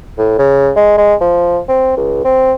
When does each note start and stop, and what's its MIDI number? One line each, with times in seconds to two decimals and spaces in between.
0.18 0.38 45
0.39 0.71 49
0.76 0.93 56
0.98 1.14 56
1.21 1.60 53
1.68 1.95 60
1.97 2.24 37
2.25 2.53 60